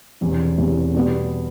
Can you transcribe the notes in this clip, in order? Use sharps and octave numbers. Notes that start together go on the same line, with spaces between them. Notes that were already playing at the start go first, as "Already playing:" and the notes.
E1 E2 C3
E1 E2 C3
B2 G3 B3